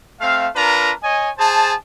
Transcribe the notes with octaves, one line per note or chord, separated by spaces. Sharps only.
A3 C4 F5
D4 F4 A#4 B4 A#5
C#5 D#5 G#5
G#4 C5 A5